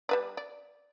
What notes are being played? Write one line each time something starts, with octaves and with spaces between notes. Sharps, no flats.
G3 B4 D5
D5